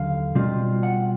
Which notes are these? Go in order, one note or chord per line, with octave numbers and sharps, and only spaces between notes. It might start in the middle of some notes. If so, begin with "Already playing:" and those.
Already playing: D#2 D3 F#3 F5
B2 G3 C4 F4
F#5